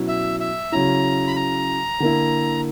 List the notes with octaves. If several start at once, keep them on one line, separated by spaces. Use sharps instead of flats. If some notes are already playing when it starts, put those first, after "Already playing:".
Already playing: B2 F#3 C#4 E4
E5
E5
C#3 F#3 C#4 E4 A#5
B5
A#5
D3 A#3 E4